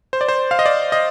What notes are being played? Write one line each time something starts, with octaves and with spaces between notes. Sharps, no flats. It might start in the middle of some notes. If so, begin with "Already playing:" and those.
C5
D5
C5
F5
D#5
D5
D#5